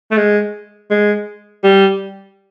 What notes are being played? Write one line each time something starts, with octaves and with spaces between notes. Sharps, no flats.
A3
G#3
G#3
G3